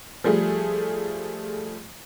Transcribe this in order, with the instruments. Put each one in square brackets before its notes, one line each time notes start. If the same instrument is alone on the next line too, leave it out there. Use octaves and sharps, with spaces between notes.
[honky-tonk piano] F3 G3 A3 G#4